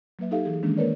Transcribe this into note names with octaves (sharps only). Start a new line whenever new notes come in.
F#3 A#3 B4 E5
D#4 G4 A4 E5 F5
E3 G#4
D#3 E3 G#3 A#3 C#4 D4
A#3 A#4 B4 C#5 D5